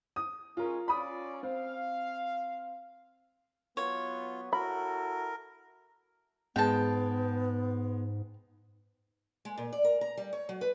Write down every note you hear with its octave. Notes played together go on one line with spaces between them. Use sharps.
D#6
G#3 C#4 F4 A#4
C#4 F4 D5 B5 D#6
C4 F5
F#3 B3 F4 C#5
E4 F#4 A4 A#4 B5
G#2 G#3 B3 G5 A5
G#3
A#2
D5
A#4
A#5
G3
C#5
F#3
B4